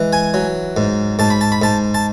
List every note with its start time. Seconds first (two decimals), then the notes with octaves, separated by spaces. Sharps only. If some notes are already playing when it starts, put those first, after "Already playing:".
Already playing: E3 G#3
0.13 G#5
0.34 F#3
0.77 G#2
1.19 G#2 A5
1.30 B5
1.41 A5
1.52 B5
1.62 G#2 A5
1.94 A5